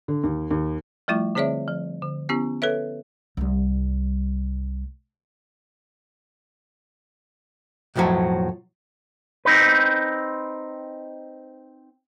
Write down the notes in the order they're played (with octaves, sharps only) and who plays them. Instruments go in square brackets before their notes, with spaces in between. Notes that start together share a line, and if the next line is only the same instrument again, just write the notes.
[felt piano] D3
D#2
D#2
[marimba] F3 G3 A3 E4 F4
D3 C4 G#4 C#5 D5 E5
F3
D3
B3 C#4 E4 G4
A4 B4 C#5 E5
[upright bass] C2 G3
[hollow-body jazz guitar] B1 F2 A2 F3 F#3
[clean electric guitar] C4 D#4 B4